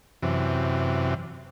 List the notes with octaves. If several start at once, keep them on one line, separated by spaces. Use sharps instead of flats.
F#2 C3 E3